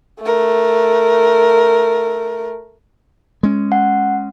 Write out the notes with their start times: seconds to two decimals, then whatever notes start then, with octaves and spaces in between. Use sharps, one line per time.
0.22 A3 A#4
3.43 G#3 C#4
3.72 F#5